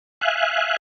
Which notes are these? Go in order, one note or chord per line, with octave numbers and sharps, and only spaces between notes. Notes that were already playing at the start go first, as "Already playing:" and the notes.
E5 F5 G#5 F#6